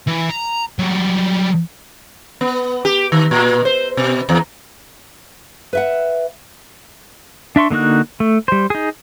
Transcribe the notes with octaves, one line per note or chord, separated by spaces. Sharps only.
E3
A#5
F#3 G3
B3
G4
D#3
A#2
C5
B2
E2
B4 E5 F#5
D4 E5 C6 C#6
D3 A#3 D#4 F#4 F#6
A3
G3 C5
D#4 G#4